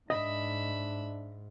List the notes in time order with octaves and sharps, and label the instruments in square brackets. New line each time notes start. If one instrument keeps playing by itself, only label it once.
[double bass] G#2 [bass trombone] D4 [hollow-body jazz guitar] D#5 [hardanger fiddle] E5 B5